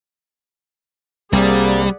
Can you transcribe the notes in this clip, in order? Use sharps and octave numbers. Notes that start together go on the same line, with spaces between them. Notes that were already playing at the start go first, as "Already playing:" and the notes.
C2 G3 A#3 C4 G#4 D5 F#5